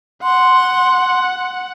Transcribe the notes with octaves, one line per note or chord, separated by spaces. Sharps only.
F#5 C6